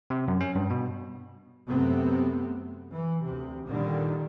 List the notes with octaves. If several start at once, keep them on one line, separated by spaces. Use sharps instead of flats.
C3
F#2
C#4
G2
B2
F#2 C3 A3 B3 C4
E3
D2 C3
A#2 D3 D#3 G3